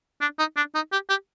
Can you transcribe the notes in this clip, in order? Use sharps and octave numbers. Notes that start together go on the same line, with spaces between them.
D4
D#4
D4
D#4
G4
G4